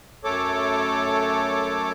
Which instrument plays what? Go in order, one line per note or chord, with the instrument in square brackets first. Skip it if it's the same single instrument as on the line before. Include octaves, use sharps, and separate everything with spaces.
[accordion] F#2 A3 A4 C#5 D6